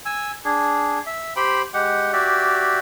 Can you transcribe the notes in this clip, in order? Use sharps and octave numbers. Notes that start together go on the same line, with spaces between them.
G#5 E6
D4 G#4
E5
G4 C5 G5 B5
G#3 G4 F#5
F#4 G4 D5 E5